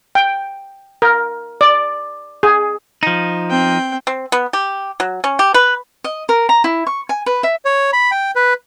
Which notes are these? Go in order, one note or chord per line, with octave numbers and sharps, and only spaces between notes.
G5
A#4
D5
G#4
F3 D#4
C4 G5
C4
B3
G4
F#3
C#4
G4
B4
D#5
A#4
A#5
E4
C#6
G#5
B4
E5
C#5
B5
G5
B4